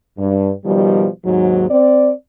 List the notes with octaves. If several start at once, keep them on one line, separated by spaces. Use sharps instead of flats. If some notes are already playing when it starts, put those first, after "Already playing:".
G2
B2 D#3 F3 G3
D#2 G#2 F#3
C4 D5